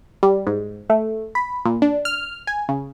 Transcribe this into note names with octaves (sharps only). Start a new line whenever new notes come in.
G3
G#2
A3
B5
A#2
D4
F6
G#5
C#3